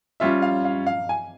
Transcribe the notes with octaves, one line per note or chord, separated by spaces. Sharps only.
G3 C#4 F4 E5
F5
F5
F5
G#5